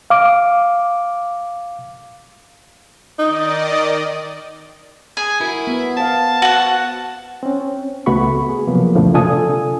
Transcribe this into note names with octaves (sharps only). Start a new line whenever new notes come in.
F5 D6
D#3 D#4 D5 D#5
G#4 G#5
E4 F#4 A#4
B3
C5 F5 A5
F#4 F#5
C4 C#4
C#2 A3 B3 F#4 B5 C#6
G#4
C3 F3 F#3 A#3 B3
C#2 F#2 A#2 D3 F3 A3
C3 D4 F4 A4 G#5 D#6